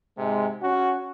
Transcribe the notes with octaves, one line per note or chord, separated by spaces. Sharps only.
G#2 C3 G#3
C#4 F#4